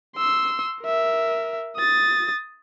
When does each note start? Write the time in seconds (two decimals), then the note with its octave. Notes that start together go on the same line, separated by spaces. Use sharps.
0.16 C6 E6
0.82 A#4 E5
1.76 D#6 A6